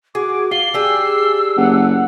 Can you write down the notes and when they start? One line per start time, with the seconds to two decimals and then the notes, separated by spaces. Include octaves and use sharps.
0.15 F#4 G#4 D6
0.51 F4 C7 G7
0.74 D4 G4 G#4 E6
1.57 F#1 F#5